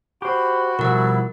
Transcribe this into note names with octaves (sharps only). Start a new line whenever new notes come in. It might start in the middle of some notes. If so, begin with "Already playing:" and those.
F#4 G4 C5 B5
B2 F3 G3 E4 A#4 F#5